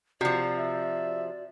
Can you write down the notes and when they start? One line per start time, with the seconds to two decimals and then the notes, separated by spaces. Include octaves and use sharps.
0.21 C3 F3 F#4 D5
0.58 E5